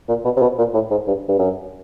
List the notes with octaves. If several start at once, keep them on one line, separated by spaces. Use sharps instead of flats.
A#2
B2
C3
B2
A#2
A2
G#2
G2
G2
F#2